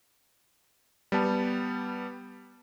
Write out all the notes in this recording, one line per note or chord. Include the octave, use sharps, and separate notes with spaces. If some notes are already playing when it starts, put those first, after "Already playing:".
G3 B3 A5